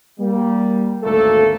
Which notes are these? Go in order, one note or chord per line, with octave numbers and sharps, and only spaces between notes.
G3 A#3
G#1 D2 A3 A#3 A4